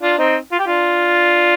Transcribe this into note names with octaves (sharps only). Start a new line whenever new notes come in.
D4 F4
C4 D#4
F4
G4
D4 F4